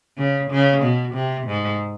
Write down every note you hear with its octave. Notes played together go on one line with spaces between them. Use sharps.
C#3
C#3
B2
C3
G#2